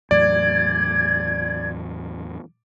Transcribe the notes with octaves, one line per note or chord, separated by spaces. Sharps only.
E2 A2 F#3 D5 G#6